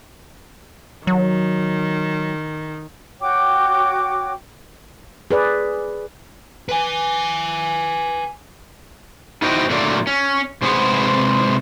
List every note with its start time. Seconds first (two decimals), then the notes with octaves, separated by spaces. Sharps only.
1.07 D#3 F#3
3.20 F#4 C#5 G5 D6
5.31 G#4 B4 D5
6.69 B4 G#5
9.42 D#4 E4 F#4 C5 D#5 G5
9.70 A#2 D3 F#3 A3 A#3
10.07 C#4
10.62 C3 G#3 G#4 B4 C5 F#5